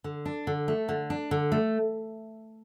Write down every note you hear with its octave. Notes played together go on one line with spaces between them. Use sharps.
D3
D4
D3
A3
D3
D4
D3
A3